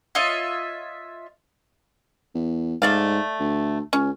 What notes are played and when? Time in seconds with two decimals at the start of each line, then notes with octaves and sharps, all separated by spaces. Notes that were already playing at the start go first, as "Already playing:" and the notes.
0.15 F4 C#5 D#5 E5
2.35 E2
2.82 G#2 A3 D5 F5
3.40 D2
3.93 C#2 C#4